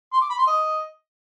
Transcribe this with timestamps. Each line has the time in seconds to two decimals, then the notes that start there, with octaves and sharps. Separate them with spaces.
0.13 C6
0.22 D6
0.30 B5
0.38 C6
0.47 D#5